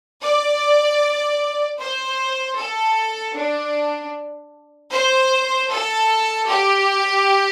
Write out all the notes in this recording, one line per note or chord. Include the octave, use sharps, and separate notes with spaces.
D5
C5
A4
D4
C5
A4
G4